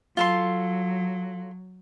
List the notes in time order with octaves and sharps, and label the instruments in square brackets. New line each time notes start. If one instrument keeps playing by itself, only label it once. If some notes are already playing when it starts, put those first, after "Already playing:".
[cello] F#3 [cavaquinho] F4 A4 C6